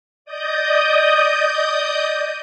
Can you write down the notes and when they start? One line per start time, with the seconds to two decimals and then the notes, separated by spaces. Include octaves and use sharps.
0.25 D5 D#5 D#6 G6